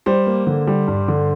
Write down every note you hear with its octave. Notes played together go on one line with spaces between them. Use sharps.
G3 C5
A#3
D3
G3
G2
D3